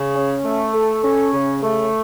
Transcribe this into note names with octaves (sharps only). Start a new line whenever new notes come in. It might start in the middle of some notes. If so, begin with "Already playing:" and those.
Already playing: C#3
C#4
A3
A4
C#4
C#3
A3